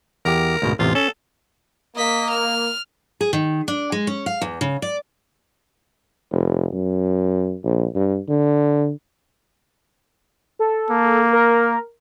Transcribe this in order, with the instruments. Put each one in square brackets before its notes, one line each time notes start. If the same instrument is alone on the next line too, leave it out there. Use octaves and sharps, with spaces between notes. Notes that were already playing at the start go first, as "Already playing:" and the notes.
[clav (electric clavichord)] E2 G4 [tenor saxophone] A#4
[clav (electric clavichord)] D2 G#2 B2
[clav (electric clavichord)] A1 E2 C3 [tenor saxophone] F4
[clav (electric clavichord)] C#4 [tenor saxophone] A4
[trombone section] A#3 [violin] D#5 B6
[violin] F6
[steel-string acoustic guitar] G#4
D#3
D4
G#3
C#4
F5
E2
C#3
D5
[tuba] F1
F#2
A#1
G2
D3
[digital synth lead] A4
[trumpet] A#3
[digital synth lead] A#4